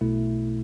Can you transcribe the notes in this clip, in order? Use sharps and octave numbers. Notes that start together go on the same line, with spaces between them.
B1 B2 A3 E4